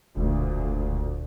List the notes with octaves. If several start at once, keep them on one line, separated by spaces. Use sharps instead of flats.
E1 D2 A#2